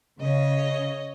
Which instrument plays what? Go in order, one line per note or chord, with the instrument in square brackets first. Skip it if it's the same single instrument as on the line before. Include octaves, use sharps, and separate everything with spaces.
[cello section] C#3 [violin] C#5 D#5